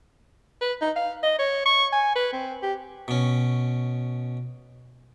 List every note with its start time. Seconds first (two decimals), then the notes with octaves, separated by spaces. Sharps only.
0.61 B4
0.81 D#4
0.96 F5
1.23 D#5
1.39 C#5
1.66 C#6
1.92 G#5
2.15 B4
2.33 C4
2.62 G4
3.08 B2 C#4